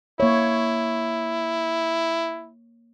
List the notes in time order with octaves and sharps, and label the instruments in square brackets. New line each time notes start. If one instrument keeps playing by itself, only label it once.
[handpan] A#3 C#5 [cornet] E4